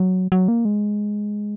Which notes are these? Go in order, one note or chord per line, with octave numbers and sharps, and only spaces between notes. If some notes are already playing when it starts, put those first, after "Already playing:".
Already playing: F#3
F#3
A#3
G#3